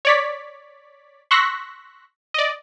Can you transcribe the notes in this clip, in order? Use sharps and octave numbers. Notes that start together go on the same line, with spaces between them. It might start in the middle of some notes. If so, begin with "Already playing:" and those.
C#5 D5 B6
C6 C#6 E6 F#6 A#6 B6
D5 D#5